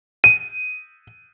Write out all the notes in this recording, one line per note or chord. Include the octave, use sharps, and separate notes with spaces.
D#7